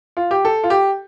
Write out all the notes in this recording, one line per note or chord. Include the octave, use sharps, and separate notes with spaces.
F4
G4
A4
F4
G4